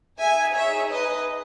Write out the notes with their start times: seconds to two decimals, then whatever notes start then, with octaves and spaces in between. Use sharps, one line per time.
0.19 D#4 G#4 E5 G#5
0.55 C#5 E5
0.91 B4 D#5